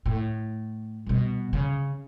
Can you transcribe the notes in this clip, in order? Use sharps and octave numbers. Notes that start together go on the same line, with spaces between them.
A2
G2 B2
C#3